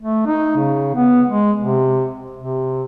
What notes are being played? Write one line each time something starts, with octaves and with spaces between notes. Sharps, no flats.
A3
D#4
C#3
B3
G#3
C3
C3